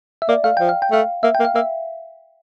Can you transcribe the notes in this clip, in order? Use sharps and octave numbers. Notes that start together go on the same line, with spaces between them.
E5
A#3 D5
A3 F5
F3 G5
F5
G5
A3 F5
A#3 E5
G5
A#3
F5
A#3 E5